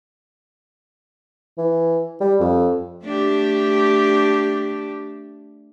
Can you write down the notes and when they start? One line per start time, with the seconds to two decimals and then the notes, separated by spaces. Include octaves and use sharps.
1.58 E3
2.21 G3
2.40 F2
3.04 A3 D4 G4